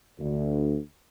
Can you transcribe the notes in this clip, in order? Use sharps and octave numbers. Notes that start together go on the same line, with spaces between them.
D2